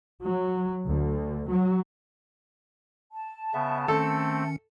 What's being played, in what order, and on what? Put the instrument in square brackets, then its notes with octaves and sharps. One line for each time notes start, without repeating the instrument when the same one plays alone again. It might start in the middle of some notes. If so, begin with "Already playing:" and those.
[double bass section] F#3
D2
F#3
[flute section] A5
[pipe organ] C#3 B3 [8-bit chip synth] E5
[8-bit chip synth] D#3 C#4 C#7 [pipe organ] A3 C4 [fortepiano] A4